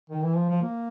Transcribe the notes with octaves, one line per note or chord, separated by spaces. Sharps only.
D#3
E3
F3
F3
A#3